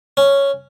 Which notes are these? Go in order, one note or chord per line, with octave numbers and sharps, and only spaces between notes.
C#4